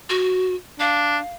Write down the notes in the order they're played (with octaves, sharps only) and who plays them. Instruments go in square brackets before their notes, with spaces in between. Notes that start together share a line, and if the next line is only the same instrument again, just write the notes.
[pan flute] F#4
[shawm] D4 [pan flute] F5